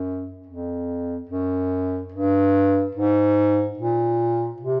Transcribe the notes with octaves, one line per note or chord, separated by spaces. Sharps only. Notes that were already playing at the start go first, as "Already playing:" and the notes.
Already playing: F#2
F2
F#2
G2
G#2
A#2
C3